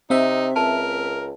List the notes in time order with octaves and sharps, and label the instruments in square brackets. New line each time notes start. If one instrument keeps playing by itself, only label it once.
[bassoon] C3 [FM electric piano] C4 E5 [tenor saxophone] D#4
[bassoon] C#2 [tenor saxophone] A#4 [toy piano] A5